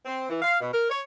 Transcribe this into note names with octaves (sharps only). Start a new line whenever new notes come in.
C4
E3
F5
B2
A#4
C#5